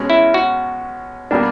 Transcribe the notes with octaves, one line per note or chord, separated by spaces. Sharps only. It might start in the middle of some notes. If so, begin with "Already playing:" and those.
Already playing: B2 G#3 C#4
E4
F#4
B2 G3 A#3 D4